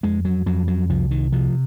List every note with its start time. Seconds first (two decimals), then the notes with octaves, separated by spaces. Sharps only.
0.03 F2 G#3
0.25 F#3
0.46 F2 F#3
0.68 F#3
0.89 C2 F3
1.11 D#3
1.32 C3 F3